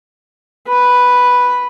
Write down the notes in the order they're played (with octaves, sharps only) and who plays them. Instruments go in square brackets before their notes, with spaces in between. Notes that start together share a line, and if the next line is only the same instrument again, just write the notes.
[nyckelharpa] B4